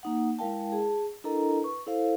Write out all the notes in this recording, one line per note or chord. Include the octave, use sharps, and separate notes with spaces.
A#3 D#4 F#5
G#3 E4 A#4 F5 G5 A5
G#4 A5
D4 E4 A4 A#4 D#5 A#5
B4 C#6
E4 A4 C5 F5